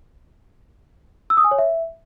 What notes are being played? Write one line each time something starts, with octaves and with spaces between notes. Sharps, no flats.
E6
D#6
G#5
C#5
E5